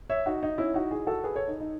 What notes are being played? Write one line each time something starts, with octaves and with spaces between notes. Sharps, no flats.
C#5 E5
D#4 F#4
D#4
C#4 E4
D#4 F#4
E4 G#4
F#4 A4
G#4 B4
A4 C#5
D#4
D#4